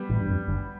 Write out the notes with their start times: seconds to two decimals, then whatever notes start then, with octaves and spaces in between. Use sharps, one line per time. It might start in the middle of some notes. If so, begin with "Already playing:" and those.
Already playing: G3 B3
0.10 A1 A2
0.21 G2
0.29 F2
0.48 G1 G2